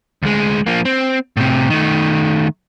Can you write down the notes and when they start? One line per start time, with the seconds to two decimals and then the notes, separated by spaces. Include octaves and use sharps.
0.23 D2 G#3
0.66 F3 A#3
0.85 C4
1.37 A2 C3
1.70 D#3 A3